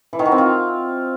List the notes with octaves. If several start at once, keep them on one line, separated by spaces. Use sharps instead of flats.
E3
D#3
F#4
C4
F4